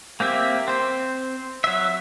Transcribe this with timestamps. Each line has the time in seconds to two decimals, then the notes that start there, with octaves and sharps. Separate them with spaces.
0.20 A#3 C4 G4 E5
0.68 C4 C5
1.64 F#3 E5